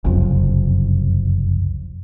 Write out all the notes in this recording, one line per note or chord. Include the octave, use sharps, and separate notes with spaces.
F#1 C2 F2